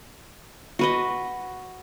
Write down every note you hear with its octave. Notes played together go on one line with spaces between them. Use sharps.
F#4 B4 D#5